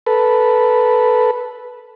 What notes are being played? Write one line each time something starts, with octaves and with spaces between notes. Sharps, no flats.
A4 B4